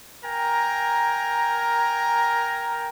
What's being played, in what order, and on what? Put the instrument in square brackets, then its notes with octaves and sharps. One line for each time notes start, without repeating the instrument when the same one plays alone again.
[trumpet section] A#4 G5 G#5 A#5